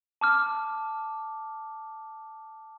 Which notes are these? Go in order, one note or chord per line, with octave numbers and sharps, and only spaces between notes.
A5 D6 F6